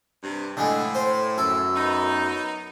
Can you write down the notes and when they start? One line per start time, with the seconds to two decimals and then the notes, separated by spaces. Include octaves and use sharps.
0.23 G2 C3
0.57 A2 D3 G#3
0.95 C5
1.38 F#2 A4
1.76 B3 D#4